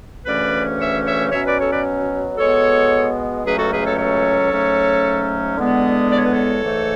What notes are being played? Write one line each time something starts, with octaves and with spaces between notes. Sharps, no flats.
D2 C#3 E3 A3 C#4 B4 D5
C#5 E5
C#5 E5
B2 F#3 C#4 C#5 E5
B4 D5
A4 C#5
B4 D5
B2 G#3 B3 A4 C#5
C#2 B2 F#3 A3 C#4 G#4 B4
F#4 A4
G#4 B4
A4 C#5
A4 C#5
G#2 F#3 A3 C#4
E2 D3 G#3 B3
D5
C#5
B4
A4 C#5
G#2 E3 A3